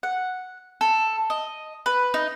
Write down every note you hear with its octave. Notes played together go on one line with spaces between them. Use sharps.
F#5
A4
D#5
B4
D#4